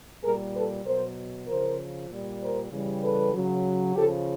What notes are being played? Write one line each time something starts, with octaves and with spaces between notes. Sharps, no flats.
A#2 G3 G#4 A#4
A4 B4
B2 F#3 A#4 C5
C#3 F3 A#4 C5
A#2 G3
A#4 C5
C#3 E3 G3
A4 B4
C#3 F#3
C#3 F3 G4 A4